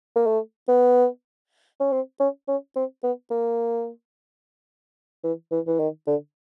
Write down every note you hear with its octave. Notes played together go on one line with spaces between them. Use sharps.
A#3
A3
B3
C#4
C4
C#4
C#4
C4
B3
A#3
E3
E3
E3
D#3
D3